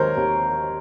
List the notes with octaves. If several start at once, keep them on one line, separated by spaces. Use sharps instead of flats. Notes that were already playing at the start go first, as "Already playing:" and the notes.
Already playing: D#2 D#3 A#4 C5 C#5
D#2